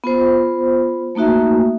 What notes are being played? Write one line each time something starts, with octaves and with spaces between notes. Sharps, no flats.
B3 F4 C5
A3 A#3 D#4 F#4 E5